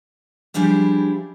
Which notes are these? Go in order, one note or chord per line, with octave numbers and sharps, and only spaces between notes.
F3 G3 D4 E4 G4 G#4